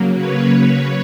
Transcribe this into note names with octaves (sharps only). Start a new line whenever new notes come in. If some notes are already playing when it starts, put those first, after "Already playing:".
Already playing: C#3 F#3 A#3
B4 C#5